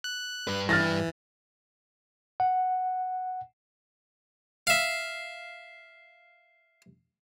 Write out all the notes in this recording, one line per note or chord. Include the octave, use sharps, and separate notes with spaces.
F#6
G2 B4
E3 F6 A6 A#6
F#5
E5 F5